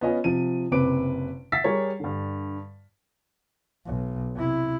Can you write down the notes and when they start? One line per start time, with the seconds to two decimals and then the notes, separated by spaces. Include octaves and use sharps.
0.01 B3 C#4 F4 D#5 G#5
0.24 C3 F3 D#7
0.72 F#1 C3 C4 B4 D6 D7
1.52 E5 F#5 E6 A6 B6 C7
1.64 G3 G#4 A#4 C#5
2.00 G2 D3
3.86 B1
4.35 C3 E4